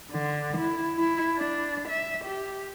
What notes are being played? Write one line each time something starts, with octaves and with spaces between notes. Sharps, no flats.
D3
E4
E4
D4
E5
G4